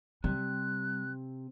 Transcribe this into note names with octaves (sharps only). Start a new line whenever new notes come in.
C3 G3 F#6